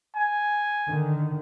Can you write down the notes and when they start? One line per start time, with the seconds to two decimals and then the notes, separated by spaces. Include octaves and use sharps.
0.16 G#5
0.89 D3 D#3